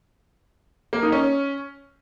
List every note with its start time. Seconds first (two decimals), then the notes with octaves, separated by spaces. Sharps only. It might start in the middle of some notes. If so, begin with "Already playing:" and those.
0.93 A#3
1.03 D#4
1.12 C#4